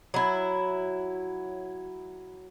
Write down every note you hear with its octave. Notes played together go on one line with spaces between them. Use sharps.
F#3 E4